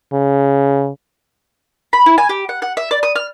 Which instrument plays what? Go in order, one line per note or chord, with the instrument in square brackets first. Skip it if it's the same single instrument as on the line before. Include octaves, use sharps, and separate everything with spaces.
[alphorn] C#3
[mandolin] B5
E4
G#5
G4
F#5
F#5
E5
D5
D#6
F6